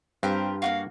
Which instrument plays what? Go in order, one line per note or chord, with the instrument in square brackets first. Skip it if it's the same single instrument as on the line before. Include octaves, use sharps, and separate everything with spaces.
[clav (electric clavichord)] G2 [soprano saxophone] C4 [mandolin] F4 G4 A#4
[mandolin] A#3 D4 F#4 [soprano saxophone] F5